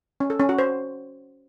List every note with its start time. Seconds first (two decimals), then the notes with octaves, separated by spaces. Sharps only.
0.20 C#4
0.30 A4
0.39 C#4
0.49 F#4
0.59 C5